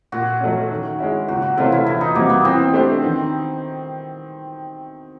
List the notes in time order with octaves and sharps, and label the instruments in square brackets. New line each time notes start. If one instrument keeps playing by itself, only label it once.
[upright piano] A#2 [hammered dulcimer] F#4
[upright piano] F#3 A3 C#4
D#3
G#3 C#4 E4
[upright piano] C#2 [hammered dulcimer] F#4
[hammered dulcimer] F#4
[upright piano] C3 E3 A3 C#4 [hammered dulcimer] F4
[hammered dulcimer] E4
[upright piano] E2 [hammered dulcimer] E4
[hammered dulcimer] D#4
[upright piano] B2 G3 C4 E4 [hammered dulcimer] A#3
[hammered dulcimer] B3
[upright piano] E3 [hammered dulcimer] C4
[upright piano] A3 D4 G4 C5
D#3